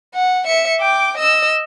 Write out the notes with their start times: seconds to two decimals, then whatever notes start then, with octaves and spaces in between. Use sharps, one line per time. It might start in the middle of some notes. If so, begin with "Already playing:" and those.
0.14 F#5
0.46 E5 C#7
0.81 G5 D6
1.18 D#5 E6